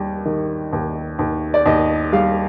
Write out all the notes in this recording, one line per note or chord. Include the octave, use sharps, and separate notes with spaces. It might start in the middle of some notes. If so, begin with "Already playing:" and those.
Already playing: D#2 G3
D#3
D#2
D#2
D5
D#2 D#5
G3 F5